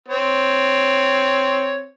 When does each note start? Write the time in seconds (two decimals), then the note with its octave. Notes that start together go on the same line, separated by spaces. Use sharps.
0.09 C4 C#5